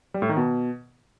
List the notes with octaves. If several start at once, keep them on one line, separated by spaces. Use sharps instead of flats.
G3
A2
D#3
B2